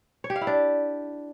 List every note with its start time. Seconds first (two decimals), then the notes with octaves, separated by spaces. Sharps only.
0.24 C#5
0.30 G4
0.36 F5
0.41 E4
0.47 D4